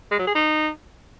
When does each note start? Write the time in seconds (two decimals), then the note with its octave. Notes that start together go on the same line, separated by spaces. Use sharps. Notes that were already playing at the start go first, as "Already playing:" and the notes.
0.11 G#3
0.19 F#3
0.27 G#4
0.35 D#4